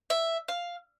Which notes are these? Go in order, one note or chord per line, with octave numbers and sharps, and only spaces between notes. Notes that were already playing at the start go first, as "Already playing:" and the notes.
E5
F5